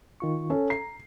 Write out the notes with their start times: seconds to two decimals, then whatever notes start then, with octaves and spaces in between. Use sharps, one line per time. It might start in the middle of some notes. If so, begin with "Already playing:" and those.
0.20 D#3 F4 C#6
0.50 C#4 A4
0.70 A#5 C7